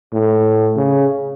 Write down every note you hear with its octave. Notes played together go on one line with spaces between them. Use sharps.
A2
C#3